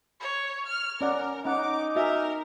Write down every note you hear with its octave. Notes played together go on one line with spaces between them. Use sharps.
C#5
F6
C#4 A#4 D5 F#5
C#4 D#4 F#5 D6
F#4 A#4 E5 G#5